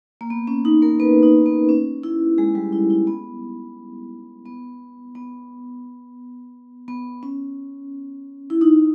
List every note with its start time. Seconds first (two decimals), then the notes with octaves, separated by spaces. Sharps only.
0.21 A#3
0.30 B3
0.47 C#4
0.65 D#4
0.82 A#3 A#4
1.00 B3 B4
1.23 D#4
1.46 B3
1.69 C#4
2.03 E4
2.38 G#3 G#4
2.55 G3 G4
2.72 E4
2.90 E4
3.07 B3
4.46 B3
5.15 B3
6.88 B3
7.23 C#4
8.50 E4
8.61 D#4